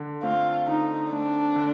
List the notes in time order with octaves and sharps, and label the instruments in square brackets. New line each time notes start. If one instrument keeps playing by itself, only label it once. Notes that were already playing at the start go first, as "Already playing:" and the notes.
Already playing: [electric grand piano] D3
[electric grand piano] A3 C4 [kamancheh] F4
[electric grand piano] D3 [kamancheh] D#4
[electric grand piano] A3 C4 [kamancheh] D4
[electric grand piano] D3